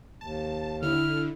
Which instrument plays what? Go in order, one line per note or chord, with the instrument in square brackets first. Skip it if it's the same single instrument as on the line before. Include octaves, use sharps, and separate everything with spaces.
[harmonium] D#2 [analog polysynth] A5
[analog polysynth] D3 [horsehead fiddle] E4 [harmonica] F6